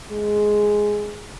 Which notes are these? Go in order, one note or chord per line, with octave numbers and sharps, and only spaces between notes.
G#3